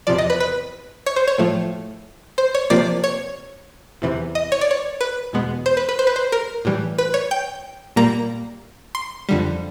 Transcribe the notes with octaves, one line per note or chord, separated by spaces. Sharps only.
E2 C3 F3 D5
D#5
B4
B4
C#5
C5
C#5
A2 F3 A3
C5
C#5
C3 F3 A#3 D5
C#5
E2 C3 E3
D#5
C#5
D5
C#5
B4
E2 B2 G#3 B3
C5
B4
B4
C5
B4
C5
A#4
A2 E3 G3
B4
C#5
G5
A#2 G3 A#3 A#5
C6
F2 D3 G3